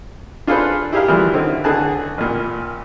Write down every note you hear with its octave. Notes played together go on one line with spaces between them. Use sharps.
D4 F4 G#4 A4 B4 C5
E4 G4 G#4 A#4 F5
F#2 E3 F3 G3
D3 D#3 C4 E4
C#2 D3 G#4 A5 F#6
A1 A#2